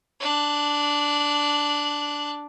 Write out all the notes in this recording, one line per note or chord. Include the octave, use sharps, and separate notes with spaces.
D4 F#6